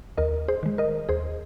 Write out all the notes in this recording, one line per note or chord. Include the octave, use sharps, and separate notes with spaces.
D#2 A#4 D#5
G#4 C5
D#3 G#3
A#4 D#5
D#2 G#4 C5